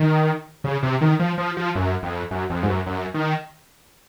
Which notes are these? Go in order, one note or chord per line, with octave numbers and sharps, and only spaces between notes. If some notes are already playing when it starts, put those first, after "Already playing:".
Already playing: D#3
C#3
C3
D#3
F3
F3
F3
F#2
F2
F#2
F2
G#2
F#2
F#2
D#3